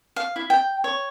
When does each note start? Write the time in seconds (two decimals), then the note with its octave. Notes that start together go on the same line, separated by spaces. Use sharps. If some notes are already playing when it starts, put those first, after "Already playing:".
0.16 F5
0.36 E4
0.50 G5
0.84 C#5